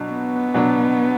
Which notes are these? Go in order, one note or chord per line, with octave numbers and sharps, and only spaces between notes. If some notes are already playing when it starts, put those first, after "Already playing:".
Already playing: B2 F#3 D4
B3
B2 F#3 D4